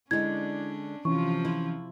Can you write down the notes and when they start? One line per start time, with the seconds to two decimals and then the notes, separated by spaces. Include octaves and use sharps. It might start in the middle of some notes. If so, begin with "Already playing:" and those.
0.11 D3 G#3 C#4 D4 E4 G#6
1.05 C3 E3 F3 C#4 F4 C#6
1.45 E4